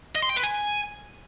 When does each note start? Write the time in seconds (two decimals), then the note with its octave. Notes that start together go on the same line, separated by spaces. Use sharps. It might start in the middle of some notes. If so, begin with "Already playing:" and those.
0.15 D#5
0.22 C6
0.29 G5
0.36 B4
0.43 G#5